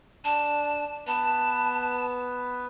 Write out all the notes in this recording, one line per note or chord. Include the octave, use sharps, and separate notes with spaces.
D4 A5
B3 B4 A5